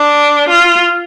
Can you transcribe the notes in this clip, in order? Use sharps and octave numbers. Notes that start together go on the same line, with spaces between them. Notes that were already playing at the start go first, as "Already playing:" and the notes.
Already playing: D4
F4